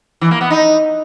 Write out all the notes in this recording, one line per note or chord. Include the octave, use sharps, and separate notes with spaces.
E3
A#3
B3
D#4